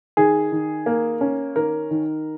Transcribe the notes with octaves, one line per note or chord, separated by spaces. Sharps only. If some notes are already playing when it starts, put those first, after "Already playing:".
D#3 G#4
D#3
A#3
C#4
D#3 A#4
D#3